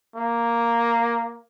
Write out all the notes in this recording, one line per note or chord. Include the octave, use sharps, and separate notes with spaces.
A#3